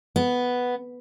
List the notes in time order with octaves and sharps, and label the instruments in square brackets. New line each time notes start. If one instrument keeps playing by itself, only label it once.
[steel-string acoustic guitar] B3